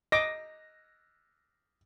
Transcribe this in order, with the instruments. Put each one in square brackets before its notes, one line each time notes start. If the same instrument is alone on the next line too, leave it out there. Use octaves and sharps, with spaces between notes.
[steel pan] D#5 D6 [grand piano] A#6